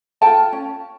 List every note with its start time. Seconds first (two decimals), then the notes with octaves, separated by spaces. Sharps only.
0.22 F4 A4 G5 A5
0.53 C#4